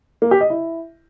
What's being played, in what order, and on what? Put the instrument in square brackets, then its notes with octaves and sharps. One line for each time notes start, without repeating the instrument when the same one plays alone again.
[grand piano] A#3
G4
D#5
E4